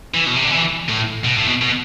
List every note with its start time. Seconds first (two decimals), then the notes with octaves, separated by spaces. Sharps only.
0.14 E3
0.27 B2
0.36 C3
0.44 D3
0.51 E3
0.89 A2
1.25 B2
1.37 A2
1.48 B2
1.62 B2